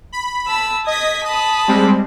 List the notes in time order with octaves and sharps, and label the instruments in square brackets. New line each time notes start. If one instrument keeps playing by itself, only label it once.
[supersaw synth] B5
[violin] A5 E6
[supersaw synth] D#5 B6 [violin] D#6 G#6
[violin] A5 B5 [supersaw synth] D#6
[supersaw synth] G3 G#3 C4